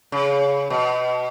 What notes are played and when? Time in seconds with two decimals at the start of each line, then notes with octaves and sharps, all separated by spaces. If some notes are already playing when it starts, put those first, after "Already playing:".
0.12 C#3
0.70 B2